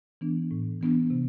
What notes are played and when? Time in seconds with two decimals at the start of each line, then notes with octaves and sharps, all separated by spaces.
0.21 E3 B3 D4
0.51 A2
0.81 E3 B3 D4
1.10 C3